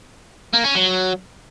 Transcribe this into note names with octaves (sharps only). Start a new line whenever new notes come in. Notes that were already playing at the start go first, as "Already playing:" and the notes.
A#3
C#4
F#3